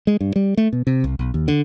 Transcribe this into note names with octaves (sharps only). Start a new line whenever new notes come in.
G#3
G2
G3
A3
B2
C3
C2
B1
D#2
D3